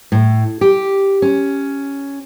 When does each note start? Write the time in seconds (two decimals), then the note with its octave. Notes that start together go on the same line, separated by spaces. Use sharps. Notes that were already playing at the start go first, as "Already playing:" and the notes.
0.12 A2
0.61 G4
1.22 C#4